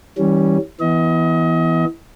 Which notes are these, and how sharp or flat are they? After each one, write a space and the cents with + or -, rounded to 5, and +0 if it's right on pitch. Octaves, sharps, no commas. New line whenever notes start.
E3 -40 G3 -10 C#4 +0
E3 +0 B3 +0 D#5 +30